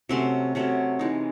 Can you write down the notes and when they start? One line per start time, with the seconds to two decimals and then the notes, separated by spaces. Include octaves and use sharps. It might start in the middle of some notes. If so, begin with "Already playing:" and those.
0.09 C3 F#3 A3 C#4 C6
0.55 C3 F#3 A3 C#4
0.99 E3 G#3 D#4